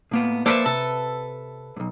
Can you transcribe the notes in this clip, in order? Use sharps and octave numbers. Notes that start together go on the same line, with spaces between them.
A2 A#3 B3
A#3 A4 B4 C5 D5 E5
C3 A4
B1 G2